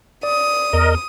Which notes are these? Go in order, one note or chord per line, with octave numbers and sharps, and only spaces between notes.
D5 D#6
E2 A#4 D#5